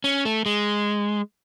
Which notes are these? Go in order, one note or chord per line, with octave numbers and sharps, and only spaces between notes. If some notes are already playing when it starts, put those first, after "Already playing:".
C#4
A3
G#3